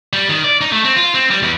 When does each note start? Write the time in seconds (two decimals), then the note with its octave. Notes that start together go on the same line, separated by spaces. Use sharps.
0.13 G3
0.29 D#3
0.44 D5
0.61 D#4
0.72 A3
0.85 C4
0.96 F4
1.15 C4
1.31 G3
1.43 E2